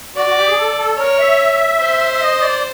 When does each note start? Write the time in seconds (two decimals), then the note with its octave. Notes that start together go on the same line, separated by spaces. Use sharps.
0.15 F#4 D5
0.26 F#4
0.37 G4
0.46 G#4
0.57 A4
0.78 A4
0.98 A#4 C#5
1.19 E5
1.80 C5
2.12 E5
2.21 D#5
2.41 D5